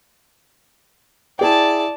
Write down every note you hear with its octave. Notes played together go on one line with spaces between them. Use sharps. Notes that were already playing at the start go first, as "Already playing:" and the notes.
E4 G#4 D5 G5 A5